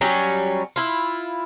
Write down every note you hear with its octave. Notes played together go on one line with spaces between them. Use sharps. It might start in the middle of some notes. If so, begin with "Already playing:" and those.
F#3 G3 C#4
E4 F4